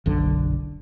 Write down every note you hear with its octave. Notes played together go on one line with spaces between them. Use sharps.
F#1 B1 D3